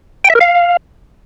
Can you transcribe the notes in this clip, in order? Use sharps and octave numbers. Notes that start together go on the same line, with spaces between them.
G5
E5
A#4
F5